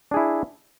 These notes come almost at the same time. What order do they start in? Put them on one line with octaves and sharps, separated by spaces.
D4 G#4 E4